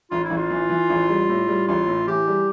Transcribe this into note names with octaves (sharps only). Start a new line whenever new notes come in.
A1 F4
E4
A1
F4
E3
E3
A1
G3
A2
G3
A1 F4
A2
E3 G4
G3